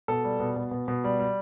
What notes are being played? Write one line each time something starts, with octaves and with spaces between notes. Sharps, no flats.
B2 A4
G3
B2
B2
B2
B2
G3
G3